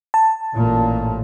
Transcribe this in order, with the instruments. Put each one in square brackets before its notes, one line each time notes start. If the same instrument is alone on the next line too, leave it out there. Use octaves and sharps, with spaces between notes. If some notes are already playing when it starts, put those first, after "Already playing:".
[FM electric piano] A5
[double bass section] A1 A#2